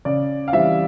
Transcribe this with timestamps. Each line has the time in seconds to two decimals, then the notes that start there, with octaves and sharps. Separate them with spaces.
0.05 C#3 D5
0.48 F5
0.53 E3 G3 C4 E5